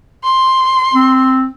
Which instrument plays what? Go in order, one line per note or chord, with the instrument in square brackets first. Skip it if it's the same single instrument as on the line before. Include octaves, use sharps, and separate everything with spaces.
[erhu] C6
[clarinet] C4